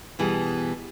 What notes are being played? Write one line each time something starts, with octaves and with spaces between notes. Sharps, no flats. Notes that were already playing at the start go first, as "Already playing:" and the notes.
B2 E3 G3 G#4